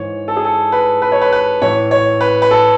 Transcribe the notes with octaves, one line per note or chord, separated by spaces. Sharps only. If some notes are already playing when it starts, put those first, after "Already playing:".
Already playing: G#2 E3 C#5
A4
G#4
A4
B4
B4
C#5
B4
B4
A2 E3 C#5
C#5
B4
B4
A4